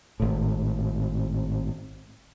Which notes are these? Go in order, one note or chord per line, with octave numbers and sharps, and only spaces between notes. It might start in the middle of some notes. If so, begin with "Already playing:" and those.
G#1 A2